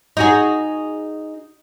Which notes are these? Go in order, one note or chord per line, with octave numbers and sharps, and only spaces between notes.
D#4 F#4 G#4